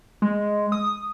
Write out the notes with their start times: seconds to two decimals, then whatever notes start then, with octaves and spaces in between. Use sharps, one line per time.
0.22 G#3
0.72 D#6